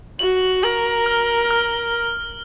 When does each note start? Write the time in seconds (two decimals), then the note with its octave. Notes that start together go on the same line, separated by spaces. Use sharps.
0.19 F#4 F#7
0.63 A#4 F#7
1.06 F6
1.50 F6